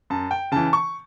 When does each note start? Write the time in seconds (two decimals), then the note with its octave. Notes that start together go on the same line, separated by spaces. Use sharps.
0.10 F#2 A5
0.31 G5
0.52 C#3 E3 A5
0.73 C#6